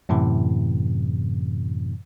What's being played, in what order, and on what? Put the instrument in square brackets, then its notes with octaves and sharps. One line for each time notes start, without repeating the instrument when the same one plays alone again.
[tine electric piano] F#2 A2 C3 E3